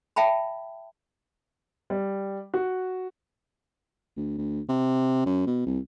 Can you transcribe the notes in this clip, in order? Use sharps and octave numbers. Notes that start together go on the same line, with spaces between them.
E5 G5 A5 B5
G3
F#4
D2
D2
C3
F#2
B2
C2